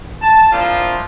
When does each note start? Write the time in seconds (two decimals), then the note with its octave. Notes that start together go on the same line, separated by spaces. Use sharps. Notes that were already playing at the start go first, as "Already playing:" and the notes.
0.22 A5
0.52 F3 A#3 C4 D4 E4 F4